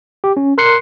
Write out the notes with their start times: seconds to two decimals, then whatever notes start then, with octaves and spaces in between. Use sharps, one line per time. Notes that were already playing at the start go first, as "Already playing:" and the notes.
0.24 G4
0.37 C#4
0.58 A#4 C6 F#6 C7 C#7